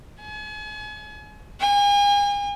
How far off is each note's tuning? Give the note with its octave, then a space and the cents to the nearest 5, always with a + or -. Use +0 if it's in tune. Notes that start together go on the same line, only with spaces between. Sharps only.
G#5 +40
G#5 -40